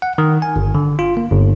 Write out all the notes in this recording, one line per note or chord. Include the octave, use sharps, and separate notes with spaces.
F#5
D#3
G#5
G1
D3
F4
A#3
G1